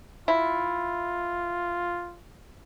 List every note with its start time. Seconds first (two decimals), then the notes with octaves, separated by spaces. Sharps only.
0.28 E4 F4